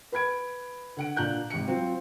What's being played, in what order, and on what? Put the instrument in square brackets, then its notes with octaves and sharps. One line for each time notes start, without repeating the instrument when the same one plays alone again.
[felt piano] B4 B5 G#6 D7
D3 F#5 D7
A#2 D4 A#5 F#6 G6
G#1 C3 C#7
F#3 C4 F4